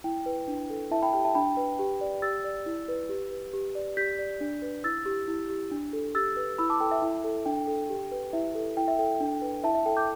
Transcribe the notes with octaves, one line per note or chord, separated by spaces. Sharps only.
E4 G5
B4
D4
A4
E4 E5 A5
G5 B5
G4 G5
E5 A5
D4 G5 B5
B4
G4
D5
G4 E6 A6
D5
E4
B4
G4
B4
G4
D5
G4 G6 B6
D5
D4
B4
E4 E6 A6
G4
E4
G4
D4
A4
G4 E6 A6
B4
E4 B5 E6
A5 D6
A4 G5
E5
E4
A4
D4 G5
A4
G4
B4
E4 E5
A4
E4 G5
E5
A4 G5
D4
B4
E4 E5 A5
E5
A4 G5
D6 G6